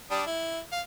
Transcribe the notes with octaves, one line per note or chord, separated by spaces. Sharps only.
G3 D4 D#6
E4
F5